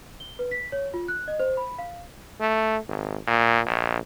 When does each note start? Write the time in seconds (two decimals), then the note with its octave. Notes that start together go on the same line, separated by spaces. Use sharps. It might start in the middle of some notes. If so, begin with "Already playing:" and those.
0.20 G7
0.39 B4
0.51 B6
0.72 C#5
0.94 F4
1.08 F#6
1.28 D#5
1.40 C5
1.57 B5
1.79 F5
2.41 A3
2.88 G#1
3.27 A#2
3.66 A#1